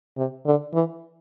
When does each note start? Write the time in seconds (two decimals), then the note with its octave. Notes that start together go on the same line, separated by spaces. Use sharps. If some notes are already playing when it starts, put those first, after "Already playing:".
0.17 C3
0.45 D3
0.74 E3